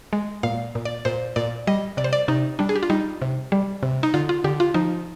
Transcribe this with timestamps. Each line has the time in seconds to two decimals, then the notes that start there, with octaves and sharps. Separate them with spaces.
0.13 G#3
0.43 A#2 F5
0.75 A#2
0.85 D5
1.05 A#2 C5
1.36 A#2 D5
1.67 G3 D#5
1.97 C3 D5
2.04 C5
2.13 D5
2.28 C3 D#4
2.59 G3 D4
2.69 G#4
2.76 G4
2.83 F4
2.90 G3 D#4
3.22 C3
3.52 G3
3.83 C3
4.03 D#4
4.14 D3 F4
4.29 F4
4.44 D3 G4
4.60 F4
4.74 F3 D#4